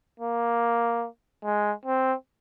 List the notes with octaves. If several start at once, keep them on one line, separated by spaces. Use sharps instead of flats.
A#3
G#3
C4